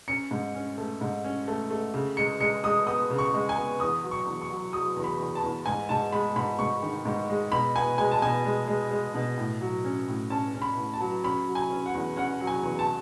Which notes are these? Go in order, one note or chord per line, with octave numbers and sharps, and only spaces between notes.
C#4 C#7
G#2
C#4
A3
G#2
C#4
A3
A3
C#3
G#3 C#7
G#3 C#7
G#3 D#6
B3 D#6
C#3
C#6
G#3
G#5
B3
E2 D#6
F#3
C#6
E2
C#6
F#3
F#3 D#6
E2
B5
E2
A5
E2
G#2 G#5
G#2 A5
G#3 B5
G#2 B5
G#2 C#6
D#3
G#2
G#3
B2 B5
B3 G#5
G#3 G#5
A5
B2 G#5
G#3
G#3
G#3
B2
A2
F#3
C#4
A2
C#4 A5
C#4
B5
A2
A5
F#3
C#4 B5
F#3
G#5
C#4
F#5
E2
C#4 F#5
F#3
G#5
E2
A5